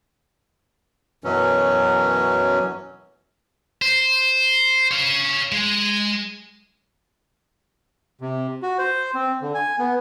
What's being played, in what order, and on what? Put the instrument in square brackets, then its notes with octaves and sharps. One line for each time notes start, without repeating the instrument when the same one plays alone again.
[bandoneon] F#2 B2 E3 F#3 C#4
[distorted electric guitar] C5
C#5 F5
G#3
[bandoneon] C3
F#4
C5
C4
D3
G#5
B3